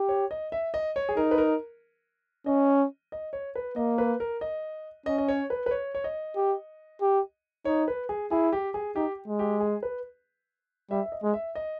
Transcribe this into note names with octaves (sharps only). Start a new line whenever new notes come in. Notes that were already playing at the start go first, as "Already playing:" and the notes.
Already playing: G4
C#5
D#5
E5
D#5
C#5
G#4
D#4 A#4
B4
A#4
C#4 D#5
D#5
C#5
B4
A#3 D#5
B4
A#4
D#5
C#4 D#5
D#5
C#5
B4
B4
C#5
C#5
D#5
G4
G4
D#4 C#5
B4
G#4
E4 G#4
G4
G#4
D#4 G4
G#3
G4
G#4
B4
G3 E5
E5
D#5
G#3
E5
D#5